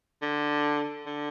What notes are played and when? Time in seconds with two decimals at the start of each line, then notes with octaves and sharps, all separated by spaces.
0.22 D3
1.07 D3